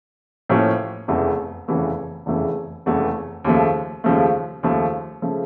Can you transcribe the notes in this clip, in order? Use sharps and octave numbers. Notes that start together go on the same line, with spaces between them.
A2 F3 A#3 C#4
F1 E2 C#3 E3 A3
F1 E2 C#3 E3 A3
F1 E2 C#3 E3 A3
F1 E2 C#3 E3 A3
D#2 C#3 F3 A3
D#2 C#3 F3 A3
D#2 C#3 F3 A3
C#3 F3 A3